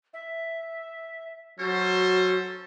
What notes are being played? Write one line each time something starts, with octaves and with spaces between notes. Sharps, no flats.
E5
F#3 C#4 F#4 A4 C5